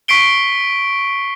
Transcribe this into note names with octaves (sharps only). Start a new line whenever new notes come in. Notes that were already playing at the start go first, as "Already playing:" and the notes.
C#6 B6 C7 D7 G7